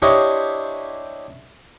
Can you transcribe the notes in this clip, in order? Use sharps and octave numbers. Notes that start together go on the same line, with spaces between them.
D4 E4 G4 C5 C#5 D#5